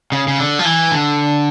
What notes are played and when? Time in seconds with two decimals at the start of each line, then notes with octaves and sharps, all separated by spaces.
0.12 C#3
0.28 C#3
0.39 D3
0.59 F3
0.65 E3
0.91 D3